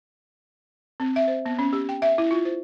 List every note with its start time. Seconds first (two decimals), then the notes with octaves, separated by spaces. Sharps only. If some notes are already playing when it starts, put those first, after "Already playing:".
1.00 C4
1.16 E5
1.28 C5
1.46 B3
1.59 C#4
1.73 G4
1.89 G5
2.02 E5
2.18 E4
2.31 F4
2.45 C5